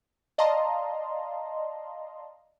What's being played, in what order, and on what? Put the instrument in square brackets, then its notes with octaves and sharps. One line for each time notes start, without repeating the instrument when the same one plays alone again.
[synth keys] D5 D#5 F5 A5 A#5 C6